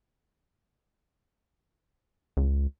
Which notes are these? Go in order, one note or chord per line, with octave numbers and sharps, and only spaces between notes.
C#2